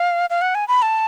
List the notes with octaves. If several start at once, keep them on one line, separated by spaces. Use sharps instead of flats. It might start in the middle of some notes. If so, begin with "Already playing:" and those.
Already playing: F5
F5
F#5
G#5
B5
A5